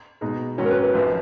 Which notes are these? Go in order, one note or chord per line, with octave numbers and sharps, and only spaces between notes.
B2 G#3 D#4
G#2 D#3 F#3 C#4 F#4
A#4
B4
B4
G#1 F#2 F3